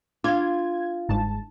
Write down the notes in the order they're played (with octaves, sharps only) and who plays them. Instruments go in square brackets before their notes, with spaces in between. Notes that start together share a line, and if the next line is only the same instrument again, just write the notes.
[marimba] D4 F5 [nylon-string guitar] F4 [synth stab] G#6
[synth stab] G1 G#2 A5